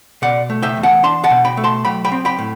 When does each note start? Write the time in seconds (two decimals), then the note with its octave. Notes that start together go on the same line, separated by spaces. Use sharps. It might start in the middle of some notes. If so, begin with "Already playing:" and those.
0.22 B2 D5 F#5
0.50 A3
0.62 E5 G5
0.77 E2
0.83 F#5 A5
1.03 D4 A5 C6
1.24 F#5 A5
1.30 B2
1.45 G5 B5
1.57 A3
1.64 A5 C6
1.85 F#3 G5 B5
2.05 G5 B5
2.12 C4
2.25 G5 B5
2.38 A2